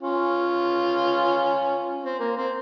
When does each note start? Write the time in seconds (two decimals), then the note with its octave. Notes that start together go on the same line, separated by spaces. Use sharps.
0.01 C#4 F4
2.04 C4
2.19 A#3
2.37 C4